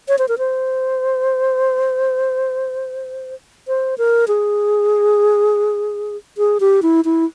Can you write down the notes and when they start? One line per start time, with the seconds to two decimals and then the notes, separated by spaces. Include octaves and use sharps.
0.08 C#5
0.18 C5
0.28 A#4
0.38 C5
3.68 C5
3.98 A#4
4.28 G#4
6.38 G#4
6.60 G4
6.82 E4
7.05 E4